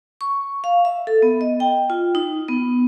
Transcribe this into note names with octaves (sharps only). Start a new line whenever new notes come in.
C#6
F5
E5
A4
B3
D#5
G5
F4
D#4
B3